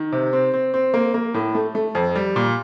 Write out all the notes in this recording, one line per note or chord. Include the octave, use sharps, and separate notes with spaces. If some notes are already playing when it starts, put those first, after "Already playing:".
Already playing: D#3
C3
C4
C4
C4
A#3
A#3
A2
A3
A3
F2
G3
A#2